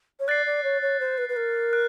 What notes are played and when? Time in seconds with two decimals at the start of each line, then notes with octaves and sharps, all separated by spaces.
0.19 C#5
0.28 D5 F#6 A6 C7
0.46 D5
0.64 C#5
0.82 C#5
1.00 C5
1.18 B4
1.29 B4
1.36 A#4
1.73 F#6